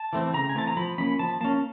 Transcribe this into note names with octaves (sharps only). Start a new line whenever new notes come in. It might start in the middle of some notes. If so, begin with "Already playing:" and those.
Already playing: A5
E3 A3 C4
C#3 A#5
G#5
E3 A3 C4 A5
A#5
F3 B5
A#3 C#4 B5
F3 A5
A#3 C#4 A5